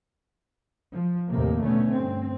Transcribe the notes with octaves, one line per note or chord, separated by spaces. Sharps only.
F3
D#2 A2 C3 A#3
B2 D3 A3 B3 C#4
G2 C4